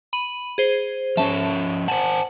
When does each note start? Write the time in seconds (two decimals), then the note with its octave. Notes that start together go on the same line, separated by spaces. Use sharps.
0.13 B5 D#7 F#7
0.58 G#4 C5
1.17 F3 C#4 C#5 E5 A5
1.88 C5 F#5 G#5 A5